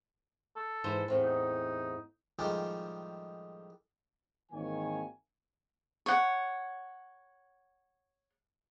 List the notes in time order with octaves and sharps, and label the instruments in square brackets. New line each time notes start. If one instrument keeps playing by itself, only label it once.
[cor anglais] A4
[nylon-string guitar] G#2 E3 C5
E2 A2 C4
[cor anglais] D#4
[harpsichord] A2 D#3 F3 G3 G#3 C#4
[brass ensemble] G#1 D#3 E3 A#3 C#5 G#5
[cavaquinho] C#5 F#5